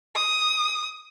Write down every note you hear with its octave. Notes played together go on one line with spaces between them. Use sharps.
D#6